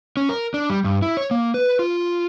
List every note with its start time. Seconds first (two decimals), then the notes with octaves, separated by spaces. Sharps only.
0.17 C#4
0.29 A#4
0.54 D4
0.70 G3
0.85 G2
1.02 E4
1.17 C#5
1.31 A#3
1.54 B4
1.79 F4